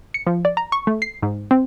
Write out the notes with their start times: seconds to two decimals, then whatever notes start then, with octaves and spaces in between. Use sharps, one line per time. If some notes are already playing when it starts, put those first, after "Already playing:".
0.14 C#7
0.26 F3
0.45 D5
0.57 A#5
0.72 C#6
0.87 A3
1.02 C7
1.23 G#2
1.51 C4